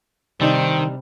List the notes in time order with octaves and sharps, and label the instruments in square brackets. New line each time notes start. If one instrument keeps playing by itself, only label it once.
[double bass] C3 [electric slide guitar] D#3 [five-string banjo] G3 D4 D#4 [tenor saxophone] C4